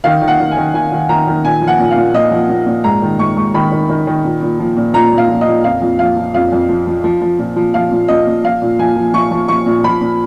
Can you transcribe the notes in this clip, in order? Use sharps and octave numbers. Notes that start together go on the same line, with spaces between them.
D#3 F5
D#3
F#5
D#3
G#5
D#3
D#3 G#5
D#3
D#3 A#5
D#3
A#2 G#5
F3
F#5
A#2
F5
A#2
A#2 D#5
F3
A#2
A#2
G#2 A#5
D#3
G#2 C#6
G#2 C#6
D#3 B5
D#3
D#3
D#3
A#2
A#2
F3
A#2
A#2 A#5
A#2
F5
F3
D#5
A#2
F2 F5
F2
F3 F5
F3
F2 F5
F2
F3
F3
F3
F3
A#2
F3
F3 F5
A#2
A#2 D#5
A#2
F3 F5
A#2
F3 G#5
F3
F3 C#6
F3
F3 C#6
A#2
F3 B5
A#2